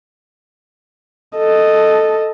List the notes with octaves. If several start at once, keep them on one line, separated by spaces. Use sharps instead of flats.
A4 D#5